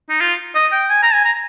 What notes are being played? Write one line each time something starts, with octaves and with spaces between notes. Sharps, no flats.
D#4
F4
D#5
G5
G#5
A#5
G#5
A#5